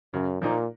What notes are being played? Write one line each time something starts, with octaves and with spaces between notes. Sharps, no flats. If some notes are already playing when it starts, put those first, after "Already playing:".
F#2 C#3
A#2 F3 A#3 D#4